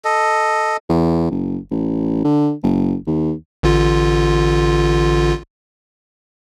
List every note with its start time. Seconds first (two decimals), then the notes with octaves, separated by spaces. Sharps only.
0.05 A4 D#5
0.89 E2
1.31 F#1
1.71 A1
2.24 D3
2.63 F#1
3.07 D#2
3.63 A1 D3 F4